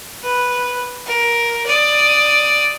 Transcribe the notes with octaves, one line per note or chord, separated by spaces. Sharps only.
B4
A#4
D5 D#6